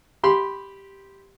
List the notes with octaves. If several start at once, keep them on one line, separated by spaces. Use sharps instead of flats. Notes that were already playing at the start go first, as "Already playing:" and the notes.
G4 B5 C6